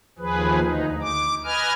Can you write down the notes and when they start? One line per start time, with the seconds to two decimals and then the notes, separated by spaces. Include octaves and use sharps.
0.19 D#2 F3 G#4 B4
0.60 D2 D#4
1.01 D6
1.44 B4 D#5 G#5 F6